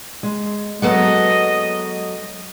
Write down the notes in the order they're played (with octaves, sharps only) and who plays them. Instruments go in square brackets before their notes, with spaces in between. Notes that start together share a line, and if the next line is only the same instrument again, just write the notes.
[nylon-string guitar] G#3
[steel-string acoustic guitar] F#3 A4 F#5 [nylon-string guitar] G#3 B3 [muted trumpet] D#5